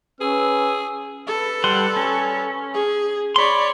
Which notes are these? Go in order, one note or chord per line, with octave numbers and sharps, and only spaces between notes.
C#4 G#4 B4 E6
A4 B4
G3 F#5 C6
C#4
G#4
C#5 D5 B5 C6